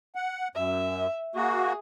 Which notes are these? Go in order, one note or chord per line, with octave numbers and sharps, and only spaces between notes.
F#5
F#2 E5
A#3 F#4 G#4